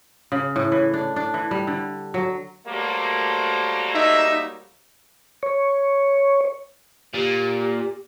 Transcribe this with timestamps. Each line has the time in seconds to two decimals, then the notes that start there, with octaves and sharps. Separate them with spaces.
0.32 C#3
0.56 A2
0.72 E3
0.94 D4
1.16 D4
1.34 E3
1.51 G3
1.67 D3
2.14 F#3
2.67 F#3 G3 A3 A#3 C5
3.94 D#4 E5
5.43 C#5
7.14 A#2 G4